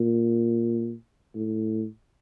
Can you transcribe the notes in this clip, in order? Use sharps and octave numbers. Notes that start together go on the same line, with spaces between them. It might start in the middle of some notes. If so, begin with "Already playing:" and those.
Already playing: A#2
A2